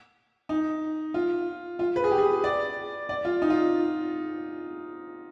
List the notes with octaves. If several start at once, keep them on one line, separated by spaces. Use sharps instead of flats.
D#4
F4
F4
B4
G#4
G4
G#4
D5
D5
F4
D#4
F4